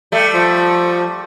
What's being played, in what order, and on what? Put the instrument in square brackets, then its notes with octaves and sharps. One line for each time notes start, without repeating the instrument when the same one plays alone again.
[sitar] G3 A3
[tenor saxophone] F3